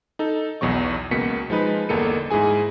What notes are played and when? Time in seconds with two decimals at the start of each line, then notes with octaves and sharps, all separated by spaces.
0.19 D#4 A4
0.61 B1 E2 B2 F#3 C#6
1.11 C#2 B2 A#3 B6 C#7
1.50 F3 G#3 D#4 B4
1.89 G1 E2 A#3 A4 C#7 D#7
2.30 G#2 E4 G#4 G#5